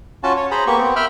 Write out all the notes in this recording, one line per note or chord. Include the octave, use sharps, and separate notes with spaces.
C#4 F4 F#4 A5
C#5
G#4 C5 A#5 B5
A#3 B3 G4 C#6
B3 C4
E5 G5 B5 F6